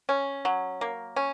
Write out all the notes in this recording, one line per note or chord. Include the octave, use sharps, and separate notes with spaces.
C#4
F#3
A#3
C#4